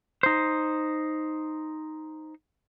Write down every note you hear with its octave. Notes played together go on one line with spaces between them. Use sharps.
D#4 C5